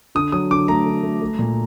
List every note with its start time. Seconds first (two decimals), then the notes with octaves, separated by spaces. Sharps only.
0.15 D3 D#6
0.32 F#3 D#6
0.51 D3 D6
0.68 A3 A#5
0.86 D3
1.03 A3
1.22 A3
1.39 A#2